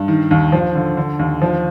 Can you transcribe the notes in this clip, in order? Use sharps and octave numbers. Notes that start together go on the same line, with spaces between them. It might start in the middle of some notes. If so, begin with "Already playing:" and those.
Already playing: G2
D#3
D#2
F3
D3
D3
D#2
F3